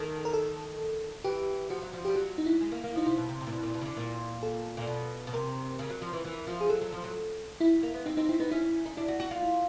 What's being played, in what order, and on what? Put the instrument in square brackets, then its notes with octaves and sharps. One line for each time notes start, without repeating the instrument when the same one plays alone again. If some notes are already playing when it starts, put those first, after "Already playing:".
Already playing: [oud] D#3 [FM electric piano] A4
[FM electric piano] A#4
A4
[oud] E3 [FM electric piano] G4
[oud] F3 [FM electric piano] F#4
[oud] F#3
F3
[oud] G3 [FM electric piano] G4
[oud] F#3 [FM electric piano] F#4
[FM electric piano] D#4
E4
[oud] G#3
A#3
A#3
[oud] F3 [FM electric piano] D#4
[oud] C3 [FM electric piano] E4
[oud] B2
C3
C3
A#2
B2
A#2
B2
C#3
D3
A#2
[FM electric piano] A4
[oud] A#2
B2
B2
[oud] C3 [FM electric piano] A#4
[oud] C#3
F#3
F3
E3
E3
F3
[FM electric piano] G#4
[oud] F#3 [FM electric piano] A4
[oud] F#3
F3
F#3
[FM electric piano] E4
[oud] A#3
B3
[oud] C4 [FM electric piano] D#4
[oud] C4 [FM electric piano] D#4
[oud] C4 [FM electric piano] E4
[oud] B3 [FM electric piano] D#4
[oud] C#4 [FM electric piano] E4
[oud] D#4
[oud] D4 [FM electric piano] E4
[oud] F#4
F#4
F4
[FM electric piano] E4